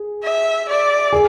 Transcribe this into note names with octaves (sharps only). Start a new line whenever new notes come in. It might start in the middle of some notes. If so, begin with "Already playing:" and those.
Already playing: G#4
E5
D5
G#4